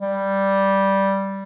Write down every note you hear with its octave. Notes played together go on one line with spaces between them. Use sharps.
G3